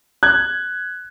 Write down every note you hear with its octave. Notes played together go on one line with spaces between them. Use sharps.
F#6 G#6